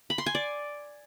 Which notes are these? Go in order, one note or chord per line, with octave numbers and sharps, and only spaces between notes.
B5
C6
G#5
D5